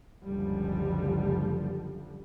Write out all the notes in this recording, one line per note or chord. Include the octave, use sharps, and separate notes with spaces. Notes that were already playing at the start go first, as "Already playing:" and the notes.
F#1 C#2 D3 F3 G3